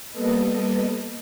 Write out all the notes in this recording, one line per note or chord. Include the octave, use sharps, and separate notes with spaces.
G3 A#3 B3 A4 B4 D#5